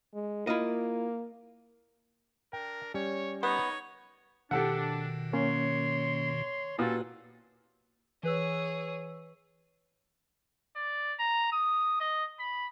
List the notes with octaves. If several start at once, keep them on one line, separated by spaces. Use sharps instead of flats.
G#3
A#3 E4 F4 D#5
D4 A#4 G5
G3 C#4 C#5
B3 D#4 C#5
B2 D#3 D4 G4 A4 F#5
A#3 C#4 C#5 C6
A#2 C#4 E4 F#4 G4 A4 B4
E3 G#4 B4 C#5 E6
D5
A#5
D#6
D#5
B5